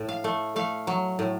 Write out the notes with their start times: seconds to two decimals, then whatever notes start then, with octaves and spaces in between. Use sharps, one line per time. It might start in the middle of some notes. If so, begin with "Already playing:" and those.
Already playing: A2
0.09 F5
0.24 A3
0.56 A3 F5
0.87 F#3
1.19 A2